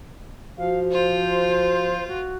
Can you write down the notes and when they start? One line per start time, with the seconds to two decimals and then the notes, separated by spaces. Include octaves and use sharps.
0.58 F3 F#4 F5
0.92 F4 C5
2.08 F#4